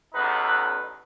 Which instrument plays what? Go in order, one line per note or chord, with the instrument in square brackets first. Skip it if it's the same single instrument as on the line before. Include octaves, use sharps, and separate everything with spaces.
[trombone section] A1 E2 D#4 B4